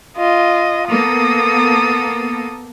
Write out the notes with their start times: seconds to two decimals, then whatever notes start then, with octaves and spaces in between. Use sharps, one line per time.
0.17 F4 D#5
0.89 A#3 B3 A4 D#6